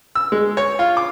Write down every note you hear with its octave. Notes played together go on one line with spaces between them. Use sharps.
E6
G#3
C#5
F4
D6